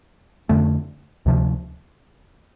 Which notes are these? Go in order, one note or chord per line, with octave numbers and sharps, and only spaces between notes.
F2 D3 A3
D2 C3 F3